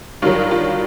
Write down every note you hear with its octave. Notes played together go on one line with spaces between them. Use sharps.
G2 D#3 F#3 F4
F4